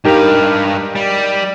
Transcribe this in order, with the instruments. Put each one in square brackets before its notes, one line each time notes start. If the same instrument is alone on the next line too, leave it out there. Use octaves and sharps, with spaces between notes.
[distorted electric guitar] G2 F5 [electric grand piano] D#4 G4 A#4
[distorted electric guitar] G3